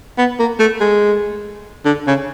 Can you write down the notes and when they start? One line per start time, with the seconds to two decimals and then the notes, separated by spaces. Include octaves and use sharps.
0.18 B3
0.39 A#3
0.60 A3
0.81 G#3
1.85 D3
2.07 C#3